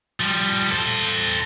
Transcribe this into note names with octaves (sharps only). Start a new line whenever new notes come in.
F3 G3
A4 C5